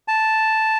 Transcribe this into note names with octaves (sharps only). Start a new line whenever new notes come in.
A5